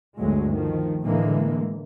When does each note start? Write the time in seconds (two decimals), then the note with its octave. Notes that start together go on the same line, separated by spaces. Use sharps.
0.19 G1 D2 F#3 G#3
0.53 D#3 F3
1.03 A2 D3 E3 G#3 A#3